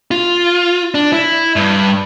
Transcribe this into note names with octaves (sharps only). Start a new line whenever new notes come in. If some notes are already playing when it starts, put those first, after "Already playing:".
F4
D4
E4
G2